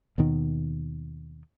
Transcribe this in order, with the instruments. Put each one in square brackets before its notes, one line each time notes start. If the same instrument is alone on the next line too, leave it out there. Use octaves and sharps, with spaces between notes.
[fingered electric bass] D#2 B2 D#3